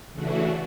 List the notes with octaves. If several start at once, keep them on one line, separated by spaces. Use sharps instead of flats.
C#3 E3 A3 D4 F#4